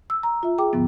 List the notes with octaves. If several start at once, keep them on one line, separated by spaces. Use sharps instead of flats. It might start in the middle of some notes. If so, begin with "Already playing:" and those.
E6
A#5
F4 E5
G#4 G5 D6
D#2 G#2 D3 F3 B3